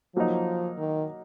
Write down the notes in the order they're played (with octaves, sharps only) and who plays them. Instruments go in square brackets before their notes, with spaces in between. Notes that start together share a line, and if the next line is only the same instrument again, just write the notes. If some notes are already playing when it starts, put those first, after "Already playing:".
[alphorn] F3 [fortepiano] F#3 A#3 D#4
[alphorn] D#3